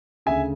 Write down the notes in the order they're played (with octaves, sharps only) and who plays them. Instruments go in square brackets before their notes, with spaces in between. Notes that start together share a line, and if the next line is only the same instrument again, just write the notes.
[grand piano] D2 C#3 E5 G#5